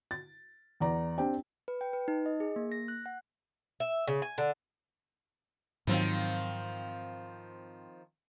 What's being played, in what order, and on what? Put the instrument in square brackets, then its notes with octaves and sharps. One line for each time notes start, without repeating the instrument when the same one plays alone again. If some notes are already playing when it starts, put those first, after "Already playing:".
[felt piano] A6
E2 D5 A#5
C4 D4 G4 G5
[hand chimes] B4
G5
B4
D#4
D#5
G#4
A#3
A#6
F#6
F#5
[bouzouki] E5
C#3
G#5
D3
[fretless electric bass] G#2 F#3 [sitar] D#3 F3 C4